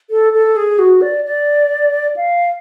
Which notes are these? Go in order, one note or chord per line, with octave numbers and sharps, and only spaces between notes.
A4
A4
G#4
F#4
D5
D5
F5